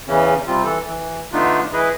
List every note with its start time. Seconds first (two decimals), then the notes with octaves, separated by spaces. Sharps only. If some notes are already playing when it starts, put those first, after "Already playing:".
0.08 E2 C#3 E3 C#4
0.47 C3 G3 C4 F4
0.64 E3 A4
0.85 E3
1.32 D3 A3 B3 D4 D#4 F4
1.73 E3 E4 G#4 B4 D#5